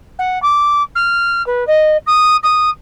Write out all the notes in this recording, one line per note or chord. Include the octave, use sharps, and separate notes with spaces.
F#5
D6
F6
B4
D#5
D#6
D#6